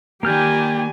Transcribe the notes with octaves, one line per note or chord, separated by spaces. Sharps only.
D#3 G3 A#3 G4 G#5 F6 G6